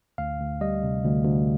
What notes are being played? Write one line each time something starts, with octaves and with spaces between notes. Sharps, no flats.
D2 F5
D2
G3 D#5
C3
D2
D2